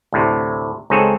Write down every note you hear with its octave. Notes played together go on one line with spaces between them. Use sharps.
D2 A2 C3
C#2 C4 D#4 G#4 A4 C#5